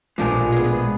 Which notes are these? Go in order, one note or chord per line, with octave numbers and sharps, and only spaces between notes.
A#1 B2 F3 G#3 A3 D4 A#4 G#5
B3 G#4